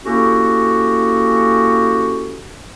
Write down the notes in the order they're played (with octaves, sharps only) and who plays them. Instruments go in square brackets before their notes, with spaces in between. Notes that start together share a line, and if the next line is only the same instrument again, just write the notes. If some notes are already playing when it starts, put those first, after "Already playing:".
[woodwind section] A#3 C#4 E4 F#4 G4 A4